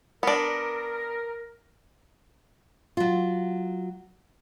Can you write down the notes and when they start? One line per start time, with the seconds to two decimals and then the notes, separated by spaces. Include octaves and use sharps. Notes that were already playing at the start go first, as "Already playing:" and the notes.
0.23 B3 D4 A#4
2.97 F#3 F4